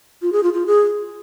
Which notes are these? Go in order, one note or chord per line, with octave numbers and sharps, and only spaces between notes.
F4
G#4
F4
F4
G#4